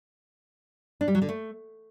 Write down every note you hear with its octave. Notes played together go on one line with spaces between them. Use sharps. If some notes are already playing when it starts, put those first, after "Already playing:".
D4
G3
F#3
D3
A3